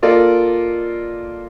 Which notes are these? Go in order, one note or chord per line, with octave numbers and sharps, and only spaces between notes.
A#3 F4 A4 D5 D#5